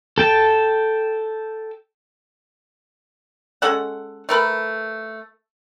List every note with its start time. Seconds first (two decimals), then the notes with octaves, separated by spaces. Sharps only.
0.18 A4 G5 A5
3.62 G#3 C#4 A4 F#5
4.29 A3 A#4 B4